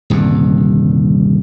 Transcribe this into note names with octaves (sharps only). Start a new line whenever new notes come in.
D#1 C2 G2 D3